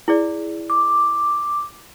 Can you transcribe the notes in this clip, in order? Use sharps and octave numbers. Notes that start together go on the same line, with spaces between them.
E4 G#4 D5
D6